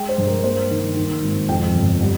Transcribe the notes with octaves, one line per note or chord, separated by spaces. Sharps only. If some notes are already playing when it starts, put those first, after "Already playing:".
Already playing: G#3 G5
C5
G2
A#4
A#3 C5
D#3
D#3
G#1
F2 G5
G1
G3